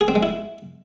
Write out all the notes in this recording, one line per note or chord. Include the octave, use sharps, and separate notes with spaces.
G#4
C4
G#3
E4